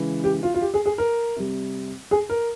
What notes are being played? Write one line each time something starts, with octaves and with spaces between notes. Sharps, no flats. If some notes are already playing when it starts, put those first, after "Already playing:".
Already playing: C#3 E3 G#3
G4
F4
F4
G4
G#4
G#4
A#4
C3 G3
G#4
A#4